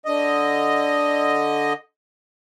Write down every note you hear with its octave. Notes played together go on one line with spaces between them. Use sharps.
D3 D#5